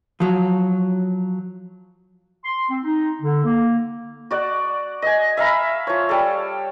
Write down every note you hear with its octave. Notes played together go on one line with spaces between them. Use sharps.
F3 F#3
C6
C4
D#4
D3
A#3
F#4 D5 F#5
D#5 G#5
E5 F5 A#5 B5
F3 C#5
G3 A4